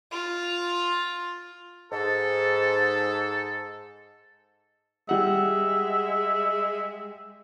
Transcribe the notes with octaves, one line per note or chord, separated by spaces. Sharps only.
F4
G#2 A4
G3 G#3 E5 F#5